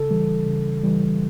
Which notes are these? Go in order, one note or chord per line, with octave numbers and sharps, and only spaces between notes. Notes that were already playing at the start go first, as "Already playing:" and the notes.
Already playing: C#3 A4
E3 G3
C#3
E3 G3